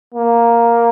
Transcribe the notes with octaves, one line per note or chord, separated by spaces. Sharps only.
A#3